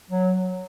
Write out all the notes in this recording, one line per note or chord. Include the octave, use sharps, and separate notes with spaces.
F#3